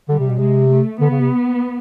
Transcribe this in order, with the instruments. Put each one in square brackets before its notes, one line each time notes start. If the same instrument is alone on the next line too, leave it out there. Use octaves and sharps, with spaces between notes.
[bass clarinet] D3 [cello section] G3
[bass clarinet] C3
B2
[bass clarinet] C3 [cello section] G#3
[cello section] A3
[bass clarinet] D3 [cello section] B3
[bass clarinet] C#3
C3